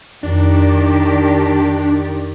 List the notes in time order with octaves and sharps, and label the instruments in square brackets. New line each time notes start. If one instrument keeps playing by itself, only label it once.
[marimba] F2 [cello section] D#3 G4 D5 [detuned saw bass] D4